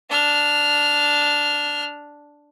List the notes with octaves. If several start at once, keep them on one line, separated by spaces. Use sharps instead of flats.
D4 F6